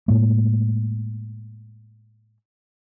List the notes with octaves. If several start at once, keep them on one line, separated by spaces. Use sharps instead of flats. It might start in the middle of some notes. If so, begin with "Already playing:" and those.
A2 G#3 A#3